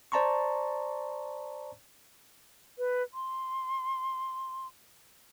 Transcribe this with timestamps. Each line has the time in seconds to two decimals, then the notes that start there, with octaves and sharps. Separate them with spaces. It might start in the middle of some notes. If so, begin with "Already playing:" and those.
0.12 C5 D5 A5 A#5 C6 C#6
2.78 B4
3.14 C6